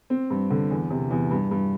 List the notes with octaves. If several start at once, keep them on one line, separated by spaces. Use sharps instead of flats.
C4
G2
D3
E2
C3
E2
G2
G2